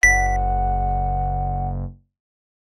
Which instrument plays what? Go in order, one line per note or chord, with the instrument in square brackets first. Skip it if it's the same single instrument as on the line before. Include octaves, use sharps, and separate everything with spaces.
[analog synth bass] F#1 [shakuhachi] F#5 [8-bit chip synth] B6